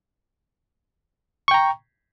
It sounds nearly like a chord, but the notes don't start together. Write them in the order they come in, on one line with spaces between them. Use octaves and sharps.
C#6 G5 A#5